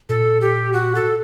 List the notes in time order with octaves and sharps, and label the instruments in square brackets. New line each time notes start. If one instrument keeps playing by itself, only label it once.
[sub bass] A#2 [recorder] A4
[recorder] G4
F#4
A4